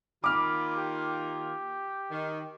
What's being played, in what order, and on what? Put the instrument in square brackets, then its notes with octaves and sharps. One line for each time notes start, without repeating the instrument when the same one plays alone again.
[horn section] D#3 A#3 F4 [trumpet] B5 [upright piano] D6 F6
[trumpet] G4
[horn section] D#3